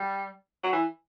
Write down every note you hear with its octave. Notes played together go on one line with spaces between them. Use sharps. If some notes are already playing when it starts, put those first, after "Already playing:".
Already playing: G3
F#3
E3